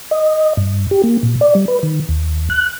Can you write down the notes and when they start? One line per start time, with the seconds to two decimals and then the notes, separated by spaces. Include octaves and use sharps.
0.11 D#5
0.57 G2
0.91 G4
1.04 A#3
1.23 A#2
1.41 D5
1.55 G3
1.68 B4
1.83 D#3
2.09 D#2
2.50 F#6